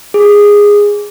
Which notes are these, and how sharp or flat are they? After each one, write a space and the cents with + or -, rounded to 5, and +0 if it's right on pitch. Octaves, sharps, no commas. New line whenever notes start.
G#4 -10